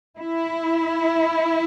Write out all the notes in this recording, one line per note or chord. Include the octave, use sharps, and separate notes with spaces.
E4